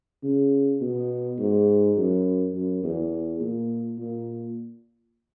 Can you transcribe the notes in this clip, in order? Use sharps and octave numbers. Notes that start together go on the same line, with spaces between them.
C#3
B2
G#2
F#2
F#2
E2
A#2
A#2